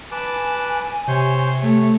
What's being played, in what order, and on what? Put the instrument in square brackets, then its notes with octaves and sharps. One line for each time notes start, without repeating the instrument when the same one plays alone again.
[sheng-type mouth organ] B4 A5 D6 [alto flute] G#5
[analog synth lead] C3 [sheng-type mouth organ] C5 C#5 G6
[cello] A3 [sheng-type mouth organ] C#5